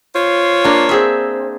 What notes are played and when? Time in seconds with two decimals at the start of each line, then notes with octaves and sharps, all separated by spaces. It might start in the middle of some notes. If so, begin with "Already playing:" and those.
0.14 F4 C5 C#5
0.64 A#3 D4
0.89 C4 G#4 E5